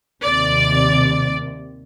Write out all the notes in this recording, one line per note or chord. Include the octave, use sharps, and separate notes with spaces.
D#2 C3 D5